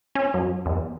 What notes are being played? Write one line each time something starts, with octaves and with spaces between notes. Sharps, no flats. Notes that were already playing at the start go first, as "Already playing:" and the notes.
C#4
F#2
E2